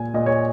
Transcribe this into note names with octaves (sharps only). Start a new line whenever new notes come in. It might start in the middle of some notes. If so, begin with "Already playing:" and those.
Already playing: A#2 G#5
A#2 D#5
C#5